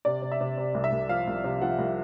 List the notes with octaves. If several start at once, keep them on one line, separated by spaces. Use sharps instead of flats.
C3 D5
C3
E5
C3
C3
C2
E5
C2
F3 F5
C2
C3
F3 F#5
C2